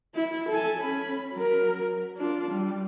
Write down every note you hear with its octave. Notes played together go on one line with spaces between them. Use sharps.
E4
A4 G#5
C#4 B5
F#3 A#4
D4 F4
G3